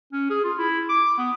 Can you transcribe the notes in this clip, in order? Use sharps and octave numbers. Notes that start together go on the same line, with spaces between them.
C#4
G#4
F4
E4
D6
B3